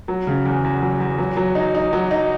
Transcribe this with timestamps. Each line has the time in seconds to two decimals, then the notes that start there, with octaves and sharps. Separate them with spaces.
0.08 F#3
0.27 C#3
0.45 E2
0.64 E2
0.82 F#3
1.00 E2
1.18 F#3
1.37 F#3
1.55 D#4
1.75 D#4
1.93 F#3
2.11 D#4